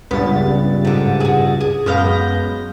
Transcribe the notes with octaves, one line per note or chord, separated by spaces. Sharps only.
C#2 G2 B3 A6
G#2 D3
F#4 G#4
G#4
F#2 G#3 B3 F5 G6 A#6